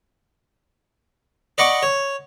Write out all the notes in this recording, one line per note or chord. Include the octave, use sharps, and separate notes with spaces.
D5 D#5 F#5 B5 C#6 D6
C#5